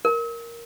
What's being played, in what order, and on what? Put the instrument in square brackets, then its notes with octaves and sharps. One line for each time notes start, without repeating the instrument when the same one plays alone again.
[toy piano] A#4